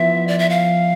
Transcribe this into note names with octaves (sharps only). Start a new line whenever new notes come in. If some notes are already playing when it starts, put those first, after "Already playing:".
Already playing: F3 B3 E4 E5
D5
E5
F5